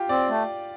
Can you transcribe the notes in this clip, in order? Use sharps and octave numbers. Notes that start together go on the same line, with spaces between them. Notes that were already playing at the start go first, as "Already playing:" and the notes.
Already playing: F4 G4
C4 D5
A3